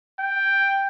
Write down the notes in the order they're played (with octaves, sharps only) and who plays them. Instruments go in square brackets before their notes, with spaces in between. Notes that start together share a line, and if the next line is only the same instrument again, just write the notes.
[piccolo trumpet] G5